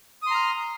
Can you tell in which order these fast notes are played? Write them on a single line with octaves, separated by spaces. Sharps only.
D#6 C6 A#5 F6